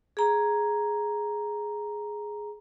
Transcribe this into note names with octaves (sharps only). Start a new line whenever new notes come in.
G#4 A#5